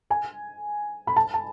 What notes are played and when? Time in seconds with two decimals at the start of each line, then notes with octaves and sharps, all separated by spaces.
0.10 G#5
1.07 B5
1.16 A5
1.34 A5